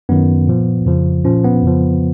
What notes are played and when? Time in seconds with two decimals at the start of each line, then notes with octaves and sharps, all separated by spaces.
0.09 F#2 D#3 B3
0.47 A#2 F3
0.85 F2 C#3 F3
1.25 A#2 F3 C#4
1.44 B3
1.63 F2 C#3 F3